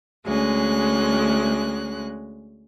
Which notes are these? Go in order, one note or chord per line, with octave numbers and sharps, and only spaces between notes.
D2 G#3 C#4 F#6